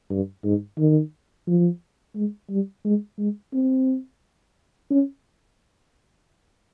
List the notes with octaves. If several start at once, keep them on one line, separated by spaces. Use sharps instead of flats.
G2
G#2
D#3
F3
G#3
G3
G#3
G#3
C4
C#4